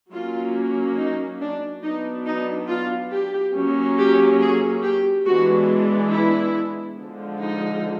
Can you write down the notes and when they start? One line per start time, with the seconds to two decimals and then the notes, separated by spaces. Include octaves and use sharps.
0.12 F#3 A#3 C#4 F4
0.97 D#4
1.40 D4
1.83 F#3 B3 D4 D#4
2.26 D#4
2.68 F4
3.12 G4
3.54 F#3 A#3 C#4
3.98 G4
4.40 G#4
4.83 G4
5.26 E3 G#3 B3 D4 F#4
6.12 E4
6.98 D3 F3 G#3
7.40 D#4